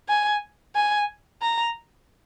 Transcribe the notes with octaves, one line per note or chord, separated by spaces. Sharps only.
G#5
G#5
A#5